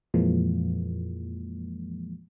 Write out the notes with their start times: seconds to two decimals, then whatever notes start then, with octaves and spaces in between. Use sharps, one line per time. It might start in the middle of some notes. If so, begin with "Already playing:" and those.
0.14 F2 A#2 E3 F3 G#3 A#3